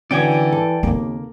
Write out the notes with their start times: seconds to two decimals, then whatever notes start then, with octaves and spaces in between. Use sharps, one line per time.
0.11 D3 E3 C#4 F#4 D5 G5 G#5
0.52 A4
0.83 D#2 C#3 A#3 C4